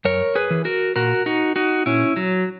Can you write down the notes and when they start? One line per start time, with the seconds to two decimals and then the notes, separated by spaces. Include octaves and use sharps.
0.05 F#2 A#4 C#5
0.35 G#4 B4
0.50 E3
0.65 F#4 A#4
0.96 A#2 F#4 A#4
1.26 D#4 F#4
1.56 D#4 F#4
1.86 A#2 C#4 E4
2.16 F#3